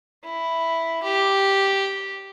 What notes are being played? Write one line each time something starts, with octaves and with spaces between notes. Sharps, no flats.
E4
G4